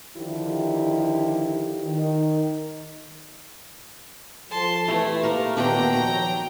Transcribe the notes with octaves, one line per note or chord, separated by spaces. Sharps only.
D3 D#3 F3 E4 G4
D#3
F3 A4 A5 C6
E3 A3 E4 G4
A#3 A#4
D#2 A#2 B3 D4 G5 A#5
D#2 F3 F#3